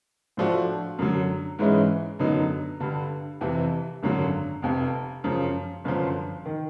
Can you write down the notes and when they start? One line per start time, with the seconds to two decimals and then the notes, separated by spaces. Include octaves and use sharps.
0.37 A2 F3 A3 D4 F#4
0.99 F#2 D3 F#3
1.59 G#2 E3 G#3 C#4 E4
2.19 F#2 D3 F#3 B3 D#4
2.80 G2 D3 G3
3.41 F2 C3 E3
4.03 G#1 F#2 D3 F#3
4.62 F1 F2 C3
5.24 F#2 C#3 F3
5.84 G1 F#2 D3 F3
6.46 D#3